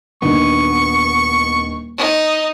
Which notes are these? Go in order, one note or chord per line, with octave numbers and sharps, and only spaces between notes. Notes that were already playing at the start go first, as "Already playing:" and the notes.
D#1 D#3 B3 D4 C#6
D#4